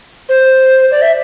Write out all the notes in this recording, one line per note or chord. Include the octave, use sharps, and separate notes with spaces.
C5
D5
E5